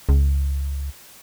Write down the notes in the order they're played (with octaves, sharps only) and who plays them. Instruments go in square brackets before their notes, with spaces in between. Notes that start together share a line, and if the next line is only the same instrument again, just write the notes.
[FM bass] C#2